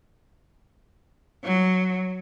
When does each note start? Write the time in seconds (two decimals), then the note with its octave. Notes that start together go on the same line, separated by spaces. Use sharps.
1.44 F#3